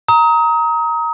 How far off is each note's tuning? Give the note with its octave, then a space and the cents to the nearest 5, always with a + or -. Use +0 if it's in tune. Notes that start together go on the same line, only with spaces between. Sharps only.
A#5 +0 D#6 +30